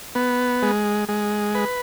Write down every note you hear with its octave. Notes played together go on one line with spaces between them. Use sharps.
B3
G#3
G#3
B4